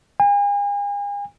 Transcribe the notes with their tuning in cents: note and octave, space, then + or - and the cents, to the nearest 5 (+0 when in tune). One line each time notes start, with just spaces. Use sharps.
G#5 -40